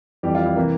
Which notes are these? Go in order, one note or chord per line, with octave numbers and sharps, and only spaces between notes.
F2 E3 G3 G4
F4
E4
C3 E3 A#3